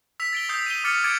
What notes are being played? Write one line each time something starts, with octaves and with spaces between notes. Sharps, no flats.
E6 B6 F7
A6 D7 G7
D#6 E6 G6 B6 C7
D#7 F7 G7
D6 F6 A6 C#7
D6 G#6 A6 C#7 D7 E7